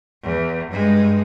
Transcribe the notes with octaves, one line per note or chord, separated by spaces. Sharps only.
E2
G2 G#3